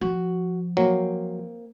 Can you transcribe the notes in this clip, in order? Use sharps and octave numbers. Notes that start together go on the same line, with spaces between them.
F3 F#4
F#3 A#3 C4